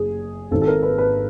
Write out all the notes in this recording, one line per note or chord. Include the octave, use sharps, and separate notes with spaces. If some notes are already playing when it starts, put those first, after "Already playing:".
Already playing: F#1 G#4
G#1 G#2 D#3 A4
A4
A#4
B4
B4